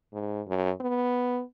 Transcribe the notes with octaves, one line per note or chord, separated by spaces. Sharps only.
G#2
F#2
B3